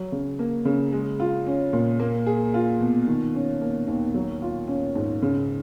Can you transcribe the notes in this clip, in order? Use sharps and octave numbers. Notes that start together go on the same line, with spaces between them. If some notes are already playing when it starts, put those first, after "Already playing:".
Already playing: F#3
C#3
A#3
C#3
G#3
F4
C#4
A#2
A#3
G#4
F4
B2
D#3
C#4
A#3
D#2
F#3
F4
C#4
G#2
C#3